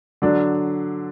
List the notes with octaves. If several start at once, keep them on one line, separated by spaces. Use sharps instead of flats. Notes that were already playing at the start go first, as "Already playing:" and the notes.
D3 F#3 D4